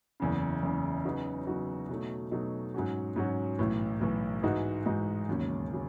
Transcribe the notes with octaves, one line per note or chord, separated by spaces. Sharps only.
F#1 E2 C#3
F#1 E2 C#3
C#3 F#3 B3 D#4 F#4
C#3 F#3 B3 D#4 F#4
B2 F#3 A3 D#4
B2 F#3 A3 D#4
G#2 F#3 C#4 F#4
G#2 F#3 C#4 F#4
B1 A2 E3
B1 A2 E3
G#2 E3 G#3 D#4 F#4
G#2 E3 G#3 D#4 F#4
E1 D#2 C#3 F#3 C#4
C#3 F#3